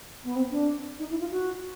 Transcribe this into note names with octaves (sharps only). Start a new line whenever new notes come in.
B3
C4
D4
D#4
E4
F4
F#4